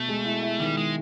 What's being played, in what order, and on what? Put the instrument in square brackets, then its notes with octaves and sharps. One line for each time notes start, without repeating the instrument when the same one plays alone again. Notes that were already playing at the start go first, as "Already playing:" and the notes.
Already playing: [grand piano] B2 [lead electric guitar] A3
[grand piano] G#3
E4
E4
[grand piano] D#3 [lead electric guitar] G3
[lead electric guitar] G#3 [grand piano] E4